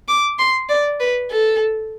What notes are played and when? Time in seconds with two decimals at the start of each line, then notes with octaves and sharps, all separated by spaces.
0.08 D6
0.39 C6
0.69 D5
1.00 B4
1.31 A4